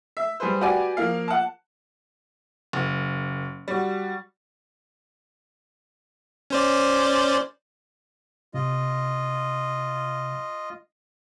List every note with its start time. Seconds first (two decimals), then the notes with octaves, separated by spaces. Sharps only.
0.17 E5
0.40 G3 G#4 B4 C5
0.61 F#4 G4 B4 D5 G#5
0.97 F3 A#3 F5
1.28 F#5 A5
2.73 F#1
3.68 G3 F#4
6.50 C#4 C5 D5
8.54 C3 F4 D#5